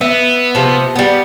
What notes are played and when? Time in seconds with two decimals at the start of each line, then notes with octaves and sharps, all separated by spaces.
0.01 B3 E5
0.55 C3 F3
0.96 G3 B3